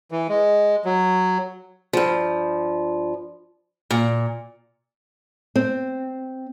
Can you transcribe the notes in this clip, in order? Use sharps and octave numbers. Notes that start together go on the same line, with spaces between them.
E3
G#3
F#3
G2 F3
A#2
C4